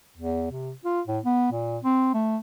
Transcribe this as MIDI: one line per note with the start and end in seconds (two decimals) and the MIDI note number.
0.17 0.48 40
0.51 0.72 48
0.85 1.01 65
1.07 1.19 45
1.25 1.52 59
1.52 1.78 46
1.84 2.12 60
2.14 2.37 57